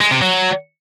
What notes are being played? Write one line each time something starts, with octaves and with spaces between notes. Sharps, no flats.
G#3
C3
F#3